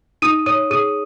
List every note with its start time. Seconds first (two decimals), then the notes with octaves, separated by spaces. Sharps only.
0.22 D#4 D#6 D#7
0.46 C#5 D#6 D#7
0.70 G#4 D#6 D#7